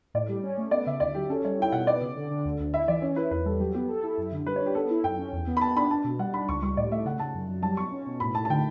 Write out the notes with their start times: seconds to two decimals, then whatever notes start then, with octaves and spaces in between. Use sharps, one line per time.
0.14 A2 D5
0.29 G3
0.43 C#4
0.58 A3
0.71 B3 D5
0.86 C#3 E5
1.00 D2 D5
1.15 F#3 G4
1.29 C#4 A4
1.44 G3 C#5
1.59 E4 G5
1.72 B2 F#5
1.87 B3 D5
2.01 C#3
2.16 D3
2.31 D3
2.45 D2
2.60 D2
2.73 E4 E5
2.88 E3 D5
3.02 C#4 C#5
3.16 E4 B4
3.31 E2 B4
3.45 G3 A4
3.60 F#3 G4
3.74 B3 G4
3.88 A4
4.03 E4
4.18 F#2
4.32 D3
4.46 G3 B4
4.56 C#5
4.61 D4
4.66 G4
4.75 B3 A4
4.90 E4
5.04 F#2 G5
5.19 C#4
5.33 E2
5.47 B3
5.57 B5
5.61 B3 A5
5.76 D4 B5
5.90 D4 A5
6.04 B2
6.19 G3 F#5
6.33 D4 B5
6.48 C#2 C#6
6.62 G3 C#6
6.77 A2 D5
6.91 A3 E5
7.05 C#3 F#5
7.19 C#3 A5
7.34 F#2
7.49 F#3
7.63 G3 A5
7.77 B2 C#6
7.92 C#4
8.06 B2
8.20 A2 B5
8.35 A2 A5
8.45 A5
8.50 D3 G5